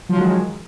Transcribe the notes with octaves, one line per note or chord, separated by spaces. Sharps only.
D#3 F3 F#3 G#3